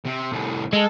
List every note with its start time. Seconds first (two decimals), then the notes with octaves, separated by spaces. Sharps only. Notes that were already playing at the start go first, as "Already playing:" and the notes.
0.05 C3
0.32 C2 A2
0.73 G#3 A4